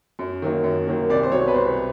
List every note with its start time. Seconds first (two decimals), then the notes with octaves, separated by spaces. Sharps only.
0.19 F#2
0.42 D#3 F#3 A#3
0.64 F#2
0.87 D#3 F#3 A#3
1.10 C2 D5
1.23 C5
1.32 B2 F#3 C#5
1.48 B4
1.55 C2 C5